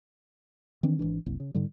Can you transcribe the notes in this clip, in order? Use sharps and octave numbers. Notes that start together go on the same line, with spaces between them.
D#3 E3 C4 D4
G#1 C#2 E3 D4
F#1 C2
C#3
G#2 D3 G3